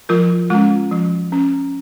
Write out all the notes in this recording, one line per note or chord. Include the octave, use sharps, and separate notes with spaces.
F3 F4 A#4
G#3 C#4 F4
F3
C#4